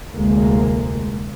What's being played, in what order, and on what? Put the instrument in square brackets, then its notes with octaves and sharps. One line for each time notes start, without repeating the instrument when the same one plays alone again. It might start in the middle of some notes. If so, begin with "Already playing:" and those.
[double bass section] F1 D2 G#3 A#3